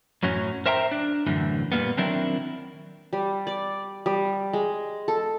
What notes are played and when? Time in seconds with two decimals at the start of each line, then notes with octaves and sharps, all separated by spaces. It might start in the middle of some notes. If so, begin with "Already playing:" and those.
0.23 F#2 A2 F#3 C#4
0.66 A#4 C5 E5 G5 A5 A#5
0.92 D4
1.26 F#2 A2 D3 E3
1.72 A#2 G3 A#3 B3
1.97 D#3 F#3 C4 D4 E4 A#4
3.13 G3
3.47 D5
4.06 G3
4.53 G#3
5.08 A4